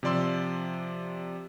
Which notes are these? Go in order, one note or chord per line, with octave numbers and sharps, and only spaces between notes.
C3 F3 D5 C6 E6